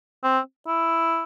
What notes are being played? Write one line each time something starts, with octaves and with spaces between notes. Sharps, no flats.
C4
E4